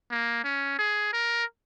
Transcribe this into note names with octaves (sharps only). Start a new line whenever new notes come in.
A#3
C#4
G#4
A#4